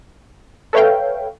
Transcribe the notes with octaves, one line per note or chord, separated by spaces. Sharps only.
A4 B4 C#5 E5 F5 G5